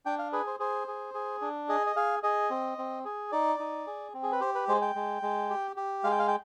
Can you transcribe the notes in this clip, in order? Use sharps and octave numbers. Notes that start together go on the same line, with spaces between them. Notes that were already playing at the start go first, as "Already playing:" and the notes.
D4 G5
F5
G#4 B4
C5
G#4 C5
G#4
G#4
D4
G#4 D#5
D#5
G#4 F5
G#4 D#5
C4
C4
G#4
D#4 D5
D#4
G#4
C4
G#4
B4
G4 C5
B4
G#3 C5
G5
G#3
G#3
G4
G4
G#3 F5
G5
F5
G5